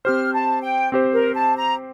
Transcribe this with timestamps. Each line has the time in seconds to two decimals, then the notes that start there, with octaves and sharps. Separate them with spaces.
0.05 C4 G4 C5 F6
0.33 A5
0.62 G5
0.92 C4 G4 C5
1.13 A#4
1.35 A5
1.57 A#5